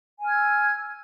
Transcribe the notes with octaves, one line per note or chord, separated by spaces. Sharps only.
G#5 E6 F6 G#6